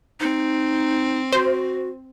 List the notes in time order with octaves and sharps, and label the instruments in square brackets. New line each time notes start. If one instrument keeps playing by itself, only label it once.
[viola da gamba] C4 [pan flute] D#4
[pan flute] F#4 [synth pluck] C5